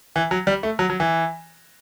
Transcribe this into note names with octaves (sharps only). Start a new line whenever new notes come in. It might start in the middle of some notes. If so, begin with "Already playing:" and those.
E3
F#3
G3
A3
F#3
F#3
E3